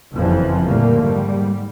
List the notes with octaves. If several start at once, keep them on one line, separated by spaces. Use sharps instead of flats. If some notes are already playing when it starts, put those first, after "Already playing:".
F#1 F2 E3 F3 G3
A#2 D3 F3 G3 A3 A#3
G#2 G3